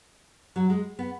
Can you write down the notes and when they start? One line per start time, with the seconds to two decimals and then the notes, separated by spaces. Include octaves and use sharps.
0.56 F#3
0.70 G#3
0.99 B3